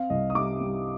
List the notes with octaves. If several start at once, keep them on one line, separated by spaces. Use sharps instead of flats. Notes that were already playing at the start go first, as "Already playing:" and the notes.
Already playing: C4 F5
C2 D#5
D#6
G3 D6
G3